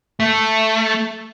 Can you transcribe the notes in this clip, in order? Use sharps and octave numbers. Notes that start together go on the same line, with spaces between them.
A3